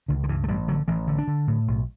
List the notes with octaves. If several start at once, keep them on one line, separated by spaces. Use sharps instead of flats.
C#2 D3
D3
G2 E3
A3
A1 G3
D3 F#3
A1 E3
D3
D4
D3
A2
B1